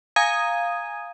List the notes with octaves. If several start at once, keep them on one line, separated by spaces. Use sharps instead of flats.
F5 G#5 A#5 D#6 G#6 D#7